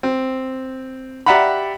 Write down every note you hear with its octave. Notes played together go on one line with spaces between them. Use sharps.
C4
G4 D5 E5 F#5 A#5 B5